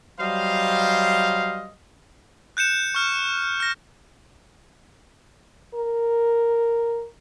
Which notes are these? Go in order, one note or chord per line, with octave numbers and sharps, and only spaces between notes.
F#3 G3 C5 D#5 F5
F#6 G6 C#7 E7
C#6 F6
F6 A#6
A#4